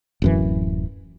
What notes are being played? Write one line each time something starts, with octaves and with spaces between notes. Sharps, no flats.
D1 F#2 E3